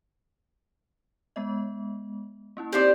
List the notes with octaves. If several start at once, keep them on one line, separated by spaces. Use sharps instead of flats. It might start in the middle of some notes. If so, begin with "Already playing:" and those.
G#3 B3 D#5
A#3 C#4 E4
C4 D#4 G4 C5 D5